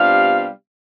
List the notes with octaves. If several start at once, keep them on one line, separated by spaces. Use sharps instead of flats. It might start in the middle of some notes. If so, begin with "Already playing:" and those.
Already playing: C3 G3 B3 D4 F4 F5